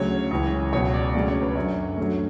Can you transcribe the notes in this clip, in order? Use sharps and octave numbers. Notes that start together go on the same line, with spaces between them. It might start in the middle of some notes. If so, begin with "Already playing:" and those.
Already playing: D2 C#3 F#3 C#5
C#2 C#3 E3
C#2 B2 F#3 C#5
D5
D2 C#3 F#3 D5
C#5
B4
F#2 D3 F#3 C#5
D2 D3 F#3